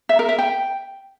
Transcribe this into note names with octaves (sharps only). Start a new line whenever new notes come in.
E5
A#4
E5
G5